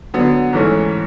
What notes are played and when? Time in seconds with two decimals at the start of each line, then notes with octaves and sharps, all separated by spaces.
0.14 D3 F#3 B3
0.53 G#2 E3 A3 C#4